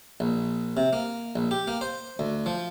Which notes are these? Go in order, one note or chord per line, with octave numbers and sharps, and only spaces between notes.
A#1
C3
A#3
A#1
G4
A#3
C5
D2
F3